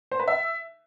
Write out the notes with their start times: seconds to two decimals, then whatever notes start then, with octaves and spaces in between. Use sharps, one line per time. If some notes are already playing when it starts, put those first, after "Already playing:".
0.12 C5
0.20 B4
0.28 E5